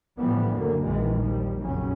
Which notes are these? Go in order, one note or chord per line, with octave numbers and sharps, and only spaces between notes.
A2 D3 E3 F3 G3 B3
F#1 D2 D3 F#3 A#3
A#1 F#2 D#3 E3 G#3
D#2 F3 G3
F1 A#1 F#2 C#3 F#3 C#4